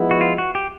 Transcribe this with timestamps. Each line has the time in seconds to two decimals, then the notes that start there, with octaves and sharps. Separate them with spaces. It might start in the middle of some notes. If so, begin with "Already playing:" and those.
Already playing: F3 G#3 B3 E4
0.11 F#4
0.21 F4
0.38 F#4
0.55 G4